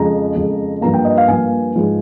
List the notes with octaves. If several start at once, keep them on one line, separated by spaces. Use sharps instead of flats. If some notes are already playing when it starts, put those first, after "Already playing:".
Already playing: F2 C#3 G#3 A#5
F2 C#3 G#3
G2 F3 A#3 A#5
G5
D#5
F5
G2 F3 A#3 G#5
G#2 F3 G#3